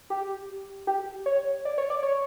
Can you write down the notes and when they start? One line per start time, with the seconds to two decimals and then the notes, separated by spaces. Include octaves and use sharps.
0.10 G4
0.87 G4
1.26 C#5
1.65 D5
1.78 C#5
1.90 D5
2.03 C#5